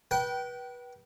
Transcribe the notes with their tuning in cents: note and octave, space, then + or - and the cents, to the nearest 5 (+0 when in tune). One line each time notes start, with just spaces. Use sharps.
B4 -25 G5 -30